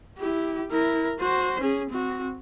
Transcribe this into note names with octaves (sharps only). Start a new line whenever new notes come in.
E4 G4
E4 A#4
F#4 C5
C#4 G#4
C4 F#4